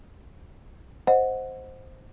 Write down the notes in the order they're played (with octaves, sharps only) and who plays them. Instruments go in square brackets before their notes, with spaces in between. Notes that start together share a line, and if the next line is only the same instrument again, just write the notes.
[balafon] C5 D#5 F#5